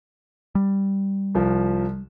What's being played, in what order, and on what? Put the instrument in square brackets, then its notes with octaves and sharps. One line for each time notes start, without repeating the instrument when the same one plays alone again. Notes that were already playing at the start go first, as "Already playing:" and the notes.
[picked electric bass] G3
[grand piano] C2 F3